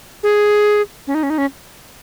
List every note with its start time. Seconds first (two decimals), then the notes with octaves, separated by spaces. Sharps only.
0.23 G#4
1.07 C#4
1.15 D#4
1.23 C#4
1.30 D#4
1.38 C#4